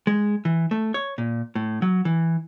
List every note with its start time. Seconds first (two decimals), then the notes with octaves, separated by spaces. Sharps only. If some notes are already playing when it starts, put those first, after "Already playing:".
0.07 G#3
0.45 E3
0.71 A3
0.94 C#5
1.18 A#2
1.55 A2
1.82 F#3
2.05 E3